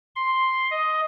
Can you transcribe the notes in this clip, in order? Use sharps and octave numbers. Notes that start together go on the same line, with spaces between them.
C6
D#5